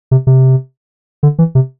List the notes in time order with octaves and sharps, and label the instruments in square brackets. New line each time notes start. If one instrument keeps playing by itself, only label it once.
[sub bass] C3
C3
D3
E3
C3